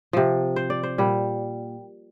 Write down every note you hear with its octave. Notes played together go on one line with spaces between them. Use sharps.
C3 F3
C5
D5
C5
A#2 G3